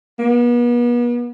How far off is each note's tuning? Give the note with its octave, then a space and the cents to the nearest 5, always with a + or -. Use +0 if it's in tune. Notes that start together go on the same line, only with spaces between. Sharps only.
B3 -40